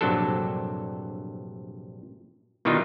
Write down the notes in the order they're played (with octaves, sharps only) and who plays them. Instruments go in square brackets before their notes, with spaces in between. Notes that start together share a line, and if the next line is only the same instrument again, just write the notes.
[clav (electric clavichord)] A#1 G2 C3 F#3 D4 A4
B2 D#3 E3 G3 D#4 F4